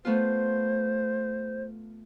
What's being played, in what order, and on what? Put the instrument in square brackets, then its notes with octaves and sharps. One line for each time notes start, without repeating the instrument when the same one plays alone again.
[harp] A3 B3 F4 [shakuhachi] C5